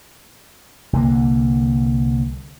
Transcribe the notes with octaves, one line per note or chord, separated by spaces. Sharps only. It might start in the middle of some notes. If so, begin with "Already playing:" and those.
C2 D3 G3 A#3